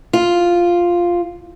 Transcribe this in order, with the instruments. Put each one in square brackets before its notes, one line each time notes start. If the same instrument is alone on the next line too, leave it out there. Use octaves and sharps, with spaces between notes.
[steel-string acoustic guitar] F4